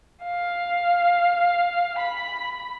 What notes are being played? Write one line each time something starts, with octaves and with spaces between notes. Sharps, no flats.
F5
B5